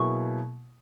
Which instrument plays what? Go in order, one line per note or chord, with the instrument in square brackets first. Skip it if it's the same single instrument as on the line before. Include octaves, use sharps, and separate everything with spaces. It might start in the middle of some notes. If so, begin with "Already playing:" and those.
Already playing: [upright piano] B2 F#3 A#3 E4 G#4 [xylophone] C#6